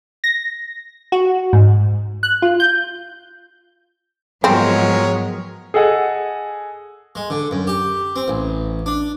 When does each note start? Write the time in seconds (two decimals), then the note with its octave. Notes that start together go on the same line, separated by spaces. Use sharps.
0.24 A#6
1.12 F#4
1.53 G#2
2.23 F#6
2.42 F4
2.60 G6
4.44 G#2 F3 F#3 G#3 B3 C4 A#4 C#5
5.74 G#4 A4 D#5 F#5 G#5
7.15 G#3
7.30 D3
7.51 F#2
7.67 G4
8.16 C4
8.28 A1
8.86 D4